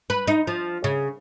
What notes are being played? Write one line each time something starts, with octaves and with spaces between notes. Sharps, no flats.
B4
D#4
F3
C#3